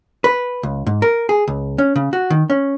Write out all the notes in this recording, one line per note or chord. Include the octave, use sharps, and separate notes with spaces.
B4
C#2
G#2
A#4
G#4
C#2
C#4
C#3
F#4
D#3
C#4